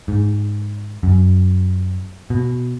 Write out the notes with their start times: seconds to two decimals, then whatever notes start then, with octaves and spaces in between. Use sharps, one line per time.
0.08 G#2
1.03 F#2
2.30 B2